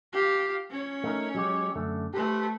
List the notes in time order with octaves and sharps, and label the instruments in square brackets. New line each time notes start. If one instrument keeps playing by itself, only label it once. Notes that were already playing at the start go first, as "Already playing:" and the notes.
[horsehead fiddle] G4 F5
C#4 C#5
[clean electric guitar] A3 D#4 A#4
F#3 G#3 G4
F#2 D3 A3
[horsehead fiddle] A3 B4 [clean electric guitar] G4 A4 C5